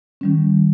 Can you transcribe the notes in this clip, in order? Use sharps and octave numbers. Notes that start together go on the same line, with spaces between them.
D#3 G3 C#4